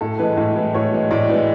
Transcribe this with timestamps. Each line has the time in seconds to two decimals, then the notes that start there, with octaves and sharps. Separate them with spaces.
0.01 A2 A4
0.19 E3 G#3 B4
0.37 A2
0.56 E3 G#3
0.74 A2 C#5
0.92 E3 G#3
1.11 A2 D5
1.30 E3 G#3